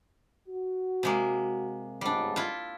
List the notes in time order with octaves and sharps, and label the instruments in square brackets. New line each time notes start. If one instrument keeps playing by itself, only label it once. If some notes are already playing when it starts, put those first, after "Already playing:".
[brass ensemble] F#4
[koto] C3 G#3 A#3
[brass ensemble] G1 C#2 G#2 [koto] G3 D4
[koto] E4 F4